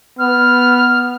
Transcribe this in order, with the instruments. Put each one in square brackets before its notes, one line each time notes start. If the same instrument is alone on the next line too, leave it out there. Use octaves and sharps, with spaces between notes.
[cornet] B3 [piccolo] F6